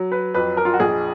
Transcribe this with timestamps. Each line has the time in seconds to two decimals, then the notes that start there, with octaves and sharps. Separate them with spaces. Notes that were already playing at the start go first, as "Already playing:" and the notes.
Already playing: F#3
0.12 B4
0.34 F2 B4
0.57 A#4
0.65 F4
0.73 F#4
0.80 A#1 G#4